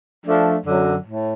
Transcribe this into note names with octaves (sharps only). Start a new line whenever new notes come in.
F3 A3 D4
F#2 D3 F#3
A2